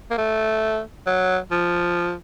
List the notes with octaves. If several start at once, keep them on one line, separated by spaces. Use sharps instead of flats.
A#3
A3
F#3
F3